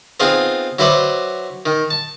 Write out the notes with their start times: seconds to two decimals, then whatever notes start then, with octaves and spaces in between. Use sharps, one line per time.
0.20 B3 C4 D#4 F4 G#4
0.79 F#3 E4 F#4 B4 C5 D5
1.66 D#3
1.90 A5